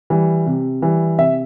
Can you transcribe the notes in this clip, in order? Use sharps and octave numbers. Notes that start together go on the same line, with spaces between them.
E3 G3
C3
E3 G3
C3 E5